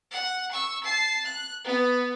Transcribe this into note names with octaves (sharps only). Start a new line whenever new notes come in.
F#5
C#6 E6
A5 C7
F#6
B3